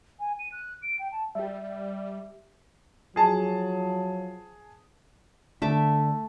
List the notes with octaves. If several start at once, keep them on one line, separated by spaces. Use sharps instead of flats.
G#5
D#7
F#6
D7
G5
A5
G3 G4 E5
F3 F#3 G#4 A5
D3 A3 E5 D6